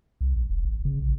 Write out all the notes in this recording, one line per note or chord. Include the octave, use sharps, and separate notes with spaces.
C2
A#1
E1
G#1
C#3
A#1